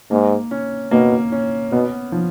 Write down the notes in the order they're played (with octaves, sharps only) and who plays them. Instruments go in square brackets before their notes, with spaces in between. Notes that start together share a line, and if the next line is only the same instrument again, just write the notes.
[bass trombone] G#2 [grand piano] A#3
[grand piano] C#4
[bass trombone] B2 [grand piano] A#3
[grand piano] C#4
[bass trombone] B2 [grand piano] B3
[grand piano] F3